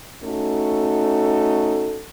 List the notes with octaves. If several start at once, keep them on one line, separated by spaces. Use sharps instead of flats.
A3 C#4 D#4 F#4 A4